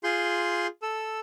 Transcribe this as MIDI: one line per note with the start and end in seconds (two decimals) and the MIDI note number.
0.04 0.67 65
0.04 0.67 68
0.04 0.67 84
0.04 0.67 91
0.82 1.20 69
0.82 1.20 88